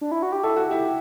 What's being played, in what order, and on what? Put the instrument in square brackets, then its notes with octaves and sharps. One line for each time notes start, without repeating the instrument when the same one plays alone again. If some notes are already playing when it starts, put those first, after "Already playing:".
[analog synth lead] D4
E4
F#4
G4
[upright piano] E4 [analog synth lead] A4
[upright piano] F#4
[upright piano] E4 [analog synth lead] G4